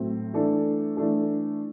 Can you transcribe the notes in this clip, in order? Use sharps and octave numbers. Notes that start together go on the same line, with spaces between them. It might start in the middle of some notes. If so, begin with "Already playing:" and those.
Already playing: A2 F#3 A3 C4
E3 A3 D4 A4
E3 A3 D4 A4